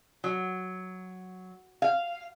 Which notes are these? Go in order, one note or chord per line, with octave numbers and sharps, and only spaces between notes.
F#3
F5